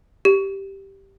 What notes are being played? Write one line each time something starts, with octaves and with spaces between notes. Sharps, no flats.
G4